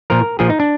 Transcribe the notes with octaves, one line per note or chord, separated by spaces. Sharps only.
A#2 F3 A#4
A#2 F3 G#4
D#4
D4